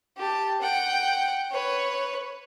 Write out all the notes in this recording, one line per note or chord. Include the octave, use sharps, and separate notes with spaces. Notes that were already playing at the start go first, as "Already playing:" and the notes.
G4 A5
F#5 G5
B4 C#5